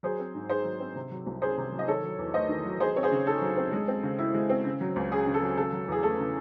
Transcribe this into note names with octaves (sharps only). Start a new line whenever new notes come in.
F#3 G#4 C5
C4
G#2
D#4 G#4 C5
F#3
C4
C3
F#3
C2
C#4 G#4 C5
C3
F#3
D#5
D#3 A4 C#5
F#3
E2
A3 C5 D#5
D#3
F#3
F#3 G#4 C5
C4 C#5
G#4 C5
C#3
D#4 A4
F#3
C4
G#3
C4
C#3
E4
G#3
C4
C#3
F#3
C#2
C#4 G#4
C#3
A4
F#3
C#3 A4
F#3
E2 G#4
A3 A4
C#3